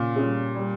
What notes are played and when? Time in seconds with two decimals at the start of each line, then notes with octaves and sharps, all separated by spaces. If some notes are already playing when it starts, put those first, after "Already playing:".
Already playing: A#2 C#3
0.16 G3 C#4 F4 G#4
0.55 G3